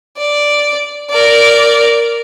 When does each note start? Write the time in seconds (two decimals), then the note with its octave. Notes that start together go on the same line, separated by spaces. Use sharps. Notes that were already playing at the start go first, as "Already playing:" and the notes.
0.18 D5
1.10 A#4 D5